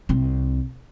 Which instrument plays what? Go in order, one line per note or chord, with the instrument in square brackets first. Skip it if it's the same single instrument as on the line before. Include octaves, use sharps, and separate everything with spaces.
[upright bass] C2 C4